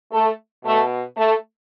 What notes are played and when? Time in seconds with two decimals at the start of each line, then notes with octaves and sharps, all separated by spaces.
0.12 A3 A4
0.65 B2 A3 A4
1.16 A3 A4